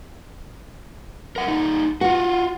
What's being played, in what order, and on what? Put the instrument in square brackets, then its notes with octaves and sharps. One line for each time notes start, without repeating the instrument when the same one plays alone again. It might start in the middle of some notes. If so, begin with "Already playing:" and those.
[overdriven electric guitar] A#4 F#5
G3 D#4
[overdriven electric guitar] F4 F#4 [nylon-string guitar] F#5